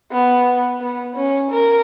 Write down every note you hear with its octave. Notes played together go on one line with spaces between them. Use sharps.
B3
B3
C#4
A#4